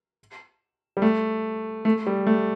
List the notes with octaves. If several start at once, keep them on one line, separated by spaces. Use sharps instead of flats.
G3
A3
A3
G3
A3